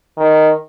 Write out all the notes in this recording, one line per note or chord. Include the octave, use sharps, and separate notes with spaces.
D#3